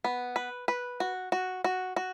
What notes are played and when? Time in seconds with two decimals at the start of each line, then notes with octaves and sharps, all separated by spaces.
0.04 B3
0.36 B4
0.68 B4
1.00 F#4
1.32 F#4
1.64 F#4
1.96 F#4